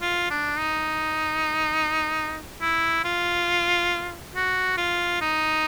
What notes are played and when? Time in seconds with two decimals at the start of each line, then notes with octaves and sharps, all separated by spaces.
0.01 F4
0.30 D4
0.58 D#4
2.61 E4
3.04 F4
4.35 F#4
4.77 F4
5.21 D#4